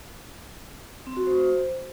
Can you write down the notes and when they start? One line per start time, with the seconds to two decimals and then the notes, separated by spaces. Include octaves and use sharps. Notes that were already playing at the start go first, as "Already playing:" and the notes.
1.07 C4
1.17 F#4
1.27 C5